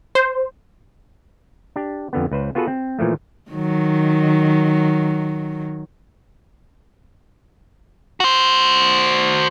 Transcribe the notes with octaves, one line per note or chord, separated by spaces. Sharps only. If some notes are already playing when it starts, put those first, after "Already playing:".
C5
D4 G4
F2 D3 B3
C#2 B4 C5
B3 F4 F#4 G#4 A4 B4
C4
A#2 E3 F3 A3
D#3 F#3
F#4 C5